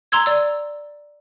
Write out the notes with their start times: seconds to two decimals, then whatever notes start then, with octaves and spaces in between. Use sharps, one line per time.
0.12 A#5 C6 E6 G#6
0.26 D5 E6